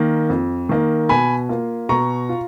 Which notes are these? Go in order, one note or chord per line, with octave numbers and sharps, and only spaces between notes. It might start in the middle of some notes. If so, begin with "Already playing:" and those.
Already playing: D#3 A#3
F2
D#3 A#3
B2 G#5 B5
A#3 F4
B2 A#5 C#6
F4